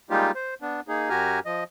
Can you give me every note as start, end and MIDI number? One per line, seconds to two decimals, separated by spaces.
0.10 0.31 55
0.10 0.31 56
0.10 0.31 58
0.10 0.31 63
0.10 0.31 65
0.10 0.31 67
0.35 0.54 72
0.62 0.81 59
0.62 0.81 62
0.88 1.09 58
0.88 1.09 63
0.88 1.09 68
1.09 1.40 42
1.09 1.40 66
1.09 1.40 67
1.09 1.40 80
1.09 1.40 82
1.09 1.40 89
1.46 1.64 53
1.46 1.64 75